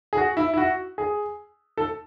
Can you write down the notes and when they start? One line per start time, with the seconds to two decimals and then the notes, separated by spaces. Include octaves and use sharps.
0.13 G#4
0.17 F#4
0.37 E4
0.54 E4
0.57 F#4
0.98 G#4
1.77 A4